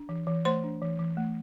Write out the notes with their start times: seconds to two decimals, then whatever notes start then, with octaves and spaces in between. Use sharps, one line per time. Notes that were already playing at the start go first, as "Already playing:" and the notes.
Already playing: D4
0.09 E3
0.27 E3
0.45 A3 C5 C6
0.64 D4
0.82 E3
0.99 E3
1.17 A3